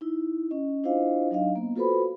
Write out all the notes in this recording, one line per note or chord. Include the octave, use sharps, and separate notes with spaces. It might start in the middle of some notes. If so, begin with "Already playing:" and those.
D#4 E4
C#4 D#5
D4 E4 F4 C5 D#5 F5
F#3 D4 D#4 D#5 F5
A#3 B3
F4 F#4 A4 B4 C5 B5